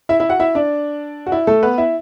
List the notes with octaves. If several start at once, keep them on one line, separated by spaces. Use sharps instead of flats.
E4 E5
E4 E5
F#4 F#5
E4 E5
D4 D5
F#4
E4
A3 A4
B3 B4
E4 E5